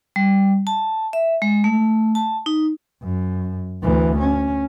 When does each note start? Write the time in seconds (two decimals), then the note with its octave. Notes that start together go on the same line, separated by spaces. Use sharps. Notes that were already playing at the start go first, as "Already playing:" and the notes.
0.16 G3
0.67 A5
1.13 E5
1.42 G#3
1.64 A3
2.15 A5
2.46 D#4
3.03 F#2
3.82 D2 E3
4.19 C#4